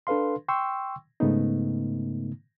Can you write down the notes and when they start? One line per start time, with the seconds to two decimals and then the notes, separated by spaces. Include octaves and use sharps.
0.07 D4 A4 B4 F5 C6
0.48 G5 C6 C#6 E6
1.20 G#2 C#3 A3 B3 D#4